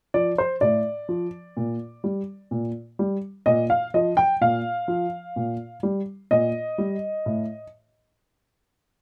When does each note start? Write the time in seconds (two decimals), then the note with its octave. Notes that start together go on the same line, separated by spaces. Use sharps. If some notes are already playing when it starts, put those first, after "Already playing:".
0.14 F3 D5
0.38 C5
0.61 A2 D5
1.09 F3
1.57 A#2
2.04 G3
2.51 A#2
2.99 G3
3.46 A#2 D#5
3.70 F5
3.94 F3 D#5
4.17 G5
4.41 A#2 F5
4.88 F3
5.36 A#2
5.83 G3
6.31 A#2 D#5
6.78 G3
7.26 A2